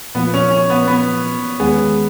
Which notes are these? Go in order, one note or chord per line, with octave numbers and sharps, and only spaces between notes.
A#2 F3 A#3 B3 F4
C#4
C#4
B3
B3
D#2 D#3 G#3 B3 C#4 G#4